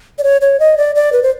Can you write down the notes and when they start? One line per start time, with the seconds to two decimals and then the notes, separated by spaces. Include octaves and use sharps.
0.19 D5
0.24 C#5
0.41 C#5
0.60 D#5
0.78 D5
0.95 D5
1.12 B4
1.23 C5